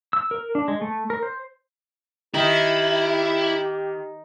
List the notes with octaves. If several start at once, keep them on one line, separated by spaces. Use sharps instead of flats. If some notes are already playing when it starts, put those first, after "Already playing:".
E6
A#4
D4
G#3
A3
A#4
C5
D#3 E4 G4